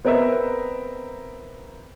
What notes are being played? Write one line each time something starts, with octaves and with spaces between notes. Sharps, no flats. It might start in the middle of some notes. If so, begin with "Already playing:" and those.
B3 C4 A#4 D#5 E5